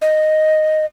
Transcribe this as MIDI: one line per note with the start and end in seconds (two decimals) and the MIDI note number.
0.01 0.85 75